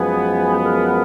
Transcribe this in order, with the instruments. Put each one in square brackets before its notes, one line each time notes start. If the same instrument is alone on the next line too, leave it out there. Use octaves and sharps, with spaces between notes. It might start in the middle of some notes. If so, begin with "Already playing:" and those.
Already playing: [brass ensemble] F#2 F3 G#3 B3 [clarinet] G#5
[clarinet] G#4
A#4